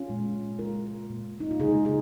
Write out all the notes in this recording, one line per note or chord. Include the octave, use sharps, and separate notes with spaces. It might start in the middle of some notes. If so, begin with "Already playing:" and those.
Already playing: C#4 F4
A#2 G#3
C#3 G#3 F4 A#4
A#2 A#3
D#4
F4
C#3 G#3 D#4 G#4
D#4 G#4